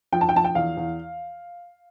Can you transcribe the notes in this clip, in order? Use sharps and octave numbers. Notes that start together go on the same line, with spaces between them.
F3 G5
A5
G5
F3 A5
G5
E2 F5
E2